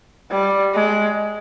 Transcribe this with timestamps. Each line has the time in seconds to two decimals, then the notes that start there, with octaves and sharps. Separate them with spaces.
0.31 G3
0.74 G#3